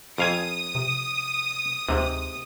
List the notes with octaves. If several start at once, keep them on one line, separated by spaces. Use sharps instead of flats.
F2 F5 G#5 D#6
C3
D2 G#2 C3